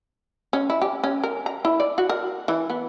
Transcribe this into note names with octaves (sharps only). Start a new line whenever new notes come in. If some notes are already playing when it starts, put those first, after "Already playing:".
C#4
E4
G4
C#4
A#4
A#5
E4
D5
F#4
A#4
E3
B3